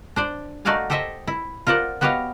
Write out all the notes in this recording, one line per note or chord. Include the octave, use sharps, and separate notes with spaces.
D4 C5 D5
A3 D#4 F#4 D5 F5 G#5
G4 A4 C5 D#5 E5
E4
F4 A#4 C5 D5 F#5
B3 F#4 G4 C#5 D#5 F5